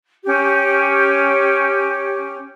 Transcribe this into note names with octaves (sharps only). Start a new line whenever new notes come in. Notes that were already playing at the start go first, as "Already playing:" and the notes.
C#4 G4